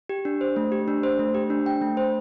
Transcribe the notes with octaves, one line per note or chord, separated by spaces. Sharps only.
G4
D4
C5
A3
G4
D4
C5
A3
G4
D4
G5
A3
C5